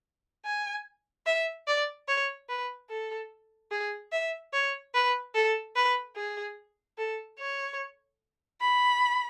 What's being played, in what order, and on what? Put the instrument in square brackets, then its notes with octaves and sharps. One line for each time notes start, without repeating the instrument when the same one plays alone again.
[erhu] G#5
E5
D5
C#5
B4
A4
G#4
E5
C#5
B4
A4
B4
G#4
A4
C#5
B5